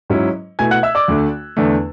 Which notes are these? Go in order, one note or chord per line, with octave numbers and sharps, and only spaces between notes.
G#2 F#3 C#4 E4
B2 A3 E4 G#5 G#6
F#5 F#6
E5 E6
D5 D6
D2 D3 A3 D4
E2 D3 A3 D4